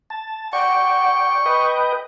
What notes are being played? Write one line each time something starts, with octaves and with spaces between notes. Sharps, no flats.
A5
D5 F#5 G5 C#6
B4 D#5 G5 B5